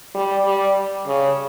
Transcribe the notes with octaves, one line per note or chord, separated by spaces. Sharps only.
G3
G3
C#3